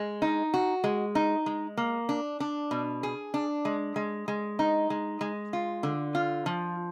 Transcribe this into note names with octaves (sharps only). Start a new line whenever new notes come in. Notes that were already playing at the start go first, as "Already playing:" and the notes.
Already playing: G#3
D#4
F#4
G#3
D#4
G#3
A#3
D4
D4
B2
G#4
D4
G#3
G#3
G#3
D#4
G#3
G#3
F4
D3
F4
F3